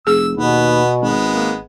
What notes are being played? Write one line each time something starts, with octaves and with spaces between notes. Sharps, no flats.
F1 G#4 E6
D#2 B2 B3
G#1 G#3 B3
A#3